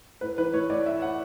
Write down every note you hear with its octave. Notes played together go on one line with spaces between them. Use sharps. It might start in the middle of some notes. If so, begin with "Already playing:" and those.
A2 B4
E3 B4
A2 C#5
A2 D5
A2 E5
A2 F#5